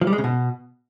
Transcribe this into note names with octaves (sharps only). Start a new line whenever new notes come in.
F3
G3
G#3
C#3
B2